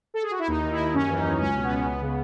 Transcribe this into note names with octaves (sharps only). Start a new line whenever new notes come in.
A4
G#4
F#4
E4
D#2 D#4
D#3
E4
D#2
F#2 C#4
E3
D#4
F#2
C#2 C#4
B2
B3
C#2
C#2 B3
C#3